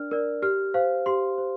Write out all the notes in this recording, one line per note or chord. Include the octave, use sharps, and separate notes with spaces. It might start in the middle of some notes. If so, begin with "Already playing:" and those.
Already playing: D4 A#4 D5 F6
A#4 D5
G4 F6
C5 F5
G4 C6
C5